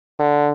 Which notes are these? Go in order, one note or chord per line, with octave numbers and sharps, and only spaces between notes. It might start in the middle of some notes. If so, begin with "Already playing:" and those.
D3